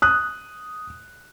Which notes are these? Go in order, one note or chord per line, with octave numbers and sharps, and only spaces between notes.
D#6 F#6